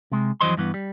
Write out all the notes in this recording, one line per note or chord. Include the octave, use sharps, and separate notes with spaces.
C3 G#3
F2 E3 F#3 C5 D#5 C6
G2 E3 B3
G3